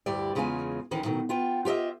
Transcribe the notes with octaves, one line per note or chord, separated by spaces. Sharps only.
D2 G2 E4 G4 D5
E2 C#3 G#3 C#4 F4 G#5
D2 D#3 E3 C#4
B2 D#3 F#3 A3
B3 F4 G5
F4 G4 C#5 D#5 E5